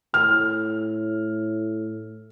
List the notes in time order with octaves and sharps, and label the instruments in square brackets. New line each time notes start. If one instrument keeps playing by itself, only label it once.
[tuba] A2 [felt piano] F6